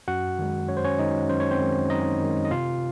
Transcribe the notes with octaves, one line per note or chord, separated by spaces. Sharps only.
F#2 F#4 F#5
D#3 G#3
F#2 C#5
C5
C#4 C#5
D#3 G#3 D#4 D#5
F#2 C5
C#5
C4 C5
D#3 G#3
F#2 D#4 D#5
D#3 G#3
D#5
C3 F4 F5